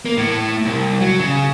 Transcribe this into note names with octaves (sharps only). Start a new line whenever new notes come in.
A#3
A2
C2
F#3
C#3